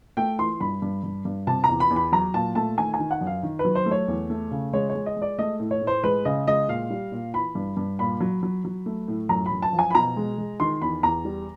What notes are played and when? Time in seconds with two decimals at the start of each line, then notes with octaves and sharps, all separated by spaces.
0.17 A3 G5
0.39 E3 C6
0.60 G2 B5
0.82 G2
1.03 G2
1.25 G2
1.47 C3 A5
1.64 A#5
1.69 E2
1.80 B5
1.90 E2
1.96 B5
2.12 F#3 A#5
2.34 A#2 A5
2.55 A3 A5
2.78 D#3 G#5
2.94 G#5
2.99 D#3
3.11 F#5
3.21 F#2
3.27 F5
3.43 D#3
3.59 B4
3.65 F#3
3.75 C5
3.86 A3
3.91 C#5
4.08 E2
4.30 A3
4.51 C#3
4.73 G#3 C#5
4.89 C#5
4.95 G#3
5.06 D#5
5.17 G#3
5.22 D5
5.38 A3 D#5
5.60 A2
5.71 C#5
5.82 A2
5.87 C5
6.04 G#3 B4
6.25 C#3 D#5
6.47 G#3 D#5
6.68 A#2 F5
6.90 G3
7.12 A#2
7.34 E3 B5
7.55 G2
7.77 G2
7.99 A#2 B5
8.20 F#3
8.43 F#3
8.65 F#3
8.86 A3
9.08 A2
9.29 F#2 A#5
9.46 B5
9.51 F#2
9.62 A5
9.73 F3
9.79 G#5
9.90 B5
9.95 B2 A#5
10.17 G#3
10.38 G#3
10.60 D#3 C6
10.82 E2 B5
11.03 E2 A#5
11.25 G3